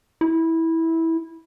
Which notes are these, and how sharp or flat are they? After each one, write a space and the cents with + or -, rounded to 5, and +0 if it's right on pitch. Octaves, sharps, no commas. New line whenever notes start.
E4 -15